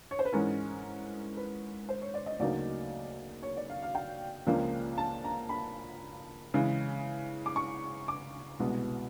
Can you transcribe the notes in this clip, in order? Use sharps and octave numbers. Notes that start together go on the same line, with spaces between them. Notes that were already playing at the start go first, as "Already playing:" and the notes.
C#5
C5
B4
G#2 E3 G#3 C#4 A#4
B4
C5
C#5
D5
D#5
D2 C#3 F#3 A#3 D#4 D5
C#5
D5
F5
F5
G5
C#2 C#3 F3 A#3 D4
A5
A#5
B5
C#3 E3 G#3
D6
C#6
D6
C2 B2 G#3 B3